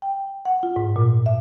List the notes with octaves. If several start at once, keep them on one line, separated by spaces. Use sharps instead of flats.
G5
F#5
F4
G#2
A#2
E5